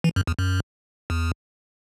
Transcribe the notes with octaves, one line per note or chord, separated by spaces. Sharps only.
E3
F#2
E2
F#2
E2